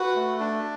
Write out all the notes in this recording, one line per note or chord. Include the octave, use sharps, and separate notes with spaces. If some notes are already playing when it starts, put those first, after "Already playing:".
Already playing: F#4 B4
A3
D4